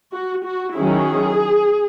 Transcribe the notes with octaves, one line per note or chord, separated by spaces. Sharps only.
F#4
F#4
D#3 F#3 C#4 E4 G#4